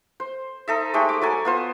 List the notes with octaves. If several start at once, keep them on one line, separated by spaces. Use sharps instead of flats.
C5
D#4 A4 E5
G#3 A3 D#4 G4
D6
F#3 A4 G#5
B3 F4 C5